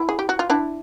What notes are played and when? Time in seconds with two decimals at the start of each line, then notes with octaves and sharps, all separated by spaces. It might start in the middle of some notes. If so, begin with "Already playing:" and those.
Already playing: E4
0.09 G#4
0.19 G4
0.29 F#4
0.39 F4
0.50 D4 E4